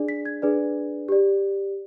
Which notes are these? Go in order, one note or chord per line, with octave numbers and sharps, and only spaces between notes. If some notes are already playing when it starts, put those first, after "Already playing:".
Already playing: D4 G#4 D5
B6
G#6
D4 G#4 B4 D5
G4 D5